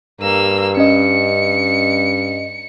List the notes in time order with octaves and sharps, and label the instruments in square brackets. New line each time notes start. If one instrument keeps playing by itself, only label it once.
[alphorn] G2 [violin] A#3 E6
[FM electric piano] C#4 D#5 [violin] C#7